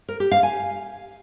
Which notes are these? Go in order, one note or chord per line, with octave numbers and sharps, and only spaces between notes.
A#4
G4
F5
G#5